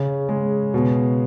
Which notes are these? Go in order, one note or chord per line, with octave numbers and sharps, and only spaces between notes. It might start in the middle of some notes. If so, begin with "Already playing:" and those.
Already playing: C#3 C#4
G#3
B2